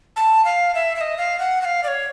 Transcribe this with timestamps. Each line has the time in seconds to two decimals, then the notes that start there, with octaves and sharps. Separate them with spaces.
0.16 A5
0.45 F5
0.74 E5
0.96 E5
1.01 D#5
1.18 F5
1.39 F#5
1.61 F#5
1.65 F5
1.83 D5
1.88 C#5